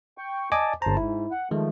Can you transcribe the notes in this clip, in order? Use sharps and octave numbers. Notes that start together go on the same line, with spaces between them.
G5 C#6
D5 D#5 G#5 A5 D6
G1 C5 A5 A#5
G#2 E4
F#5
D#3 F3 G#3 A3